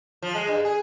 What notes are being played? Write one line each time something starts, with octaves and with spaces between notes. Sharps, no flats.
F3
G#3
G2
G#4